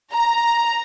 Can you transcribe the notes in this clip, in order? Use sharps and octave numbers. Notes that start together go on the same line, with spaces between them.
A#5